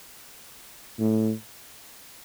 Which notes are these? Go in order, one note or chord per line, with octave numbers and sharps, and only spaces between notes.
A2